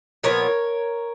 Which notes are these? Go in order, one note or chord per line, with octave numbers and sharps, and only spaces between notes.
A#2 F3 B3 A#4 C#5